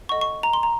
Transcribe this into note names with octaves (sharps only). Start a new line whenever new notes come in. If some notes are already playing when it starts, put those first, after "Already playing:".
A4 D#5 F#5 C#6
C#6
A#5
C6
A#5